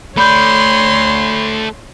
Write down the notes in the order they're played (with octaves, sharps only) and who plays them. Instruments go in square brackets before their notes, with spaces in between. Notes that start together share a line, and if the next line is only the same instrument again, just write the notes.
[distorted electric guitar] A3 D5 [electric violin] C#5 C6 [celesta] B5 G6